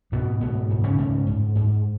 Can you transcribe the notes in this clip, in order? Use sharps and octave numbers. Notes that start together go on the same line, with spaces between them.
G#2 B2 B3
G#2 B2 B3
G#2
C#3 C#4
G#2
G#2
G#2